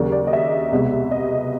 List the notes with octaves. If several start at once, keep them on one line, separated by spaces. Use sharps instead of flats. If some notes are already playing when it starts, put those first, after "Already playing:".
Already playing: D#2 C#3 F#3 A#3 D5
D5
D#5
E5
C2 B2 G#3
D#5